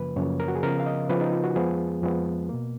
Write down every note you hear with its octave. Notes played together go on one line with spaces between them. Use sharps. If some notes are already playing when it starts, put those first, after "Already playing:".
Already playing: F#2 C#3 F3 A#3 B4
F#2 C#3 F3 A#3 C#5
A#4
F#4
G#4
C#3 F3 B3 A#4
F5
D#5
C#3 F3 B3 B4
D#4
F4
F#4
F2 F3 G#3 B3 G#4
F2 F3 G#3 B3
B2 A#3